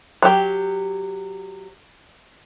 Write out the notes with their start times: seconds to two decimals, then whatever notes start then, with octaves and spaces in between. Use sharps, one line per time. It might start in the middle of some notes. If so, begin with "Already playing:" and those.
0.22 F#3 G4